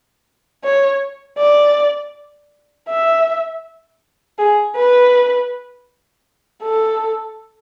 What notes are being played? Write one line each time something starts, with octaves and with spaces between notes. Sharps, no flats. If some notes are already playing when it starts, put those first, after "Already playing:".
C#5
D5
E5
G#4
B4
A4